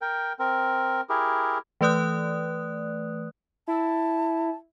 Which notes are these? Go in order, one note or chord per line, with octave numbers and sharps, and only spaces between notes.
A#4 G5
C4 A#4
E4 G4 G#4 A#4
E3 A3 B4 D5 D#6 F#6
E4 A5